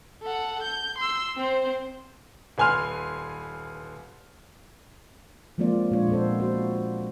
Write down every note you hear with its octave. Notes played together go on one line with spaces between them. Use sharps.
A4 F#5
G6
C6 E6
C4 C5
D#1 B4 G#5 C6 F6
F3 G#3 A#3 C4 F4 D5
A#2 G#3 D4 F4 C#5
A#2 B3 C4 A4 C5
F#4 C5